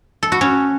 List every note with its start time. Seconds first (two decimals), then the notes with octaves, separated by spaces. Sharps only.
0.23 A4
0.32 F#4
0.41 C#4